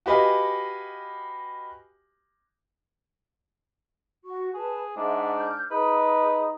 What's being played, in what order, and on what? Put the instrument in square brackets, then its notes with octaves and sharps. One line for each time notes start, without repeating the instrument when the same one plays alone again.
[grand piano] F#4 G4 B4 D#5 F5 G#5
[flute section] F#4 C#6
[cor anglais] G#4 [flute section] B4 A5
[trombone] G#2 [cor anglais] D4 [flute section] E5 F#5
[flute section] F6 G6
[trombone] D#4 [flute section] G#4 D#6 [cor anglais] B4